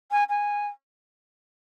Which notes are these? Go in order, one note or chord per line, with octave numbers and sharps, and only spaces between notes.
G#5
G#5